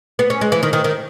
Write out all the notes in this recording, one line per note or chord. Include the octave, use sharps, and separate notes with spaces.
B3
C#4
G#3
E3
D#3
D#3
D#3